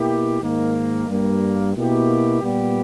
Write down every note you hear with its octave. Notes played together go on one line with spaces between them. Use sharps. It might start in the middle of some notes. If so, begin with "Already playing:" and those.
Already playing: B2 A#3 E4 G4
G#2 D#3 A#3
G2 G3 A#3
B2 A#3 E4 G4
A#2 G3 B3 G4